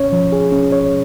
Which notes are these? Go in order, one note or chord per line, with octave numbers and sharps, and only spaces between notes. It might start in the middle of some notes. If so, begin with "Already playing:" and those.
Already playing: C#4 C#5
F3
G#4
C#4
C#5